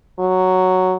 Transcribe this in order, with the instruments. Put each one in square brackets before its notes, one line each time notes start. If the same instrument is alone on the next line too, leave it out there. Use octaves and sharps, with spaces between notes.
[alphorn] F#3